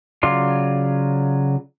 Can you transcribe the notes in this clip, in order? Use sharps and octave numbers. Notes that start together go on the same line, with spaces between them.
C#3 F#3 F4 D5 C6